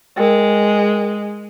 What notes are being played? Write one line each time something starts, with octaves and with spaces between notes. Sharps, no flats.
G#3 A#4 G5